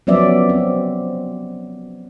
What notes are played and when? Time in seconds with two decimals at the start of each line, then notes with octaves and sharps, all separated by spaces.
0.07 F3 F#3 B3 C#4 D5 E5
0.49 C4